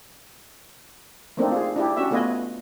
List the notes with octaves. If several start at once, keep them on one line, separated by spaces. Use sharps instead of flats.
A3 A#3 C4 D4 D#4
F4 G#4
D4 E4 G4
C#4 D4 F#4 G4 E5
A3 B3 F4 B4 D#5 G#5